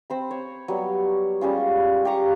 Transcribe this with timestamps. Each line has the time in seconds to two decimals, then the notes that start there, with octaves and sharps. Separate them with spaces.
0.10 C4 C5 B5
0.31 C#5
0.68 F#3 G3 B3
1.41 G3 G#3 C#4 F4
2.05 G4 F5 A#5 C#6